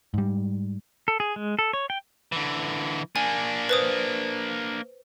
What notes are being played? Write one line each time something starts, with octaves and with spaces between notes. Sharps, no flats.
G#2 G3
A4
G#4
G#3
A4
C#5
G5
D3 E3
A#3 D4 G#5
B4 C5 D#6